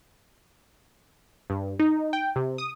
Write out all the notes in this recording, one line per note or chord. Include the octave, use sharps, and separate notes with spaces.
G2
D#4
G5
C3
D#6